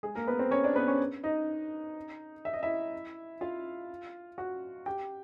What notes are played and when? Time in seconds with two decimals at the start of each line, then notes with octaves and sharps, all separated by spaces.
0.03 G#3 G#4
0.15 A#3 A#4
0.28 B3 B4
0.39 C4 C5
0.51 C#4 C#5
0.64 D4 D5
0.76 B3 B4
0.88 C#4 C#5
1.24 D#4 D#5
2.45 E5
2.53 D#5
2.63 E4 E5
3.41 F4 F5
4.38 F#4 F#5
4.86 G4 G5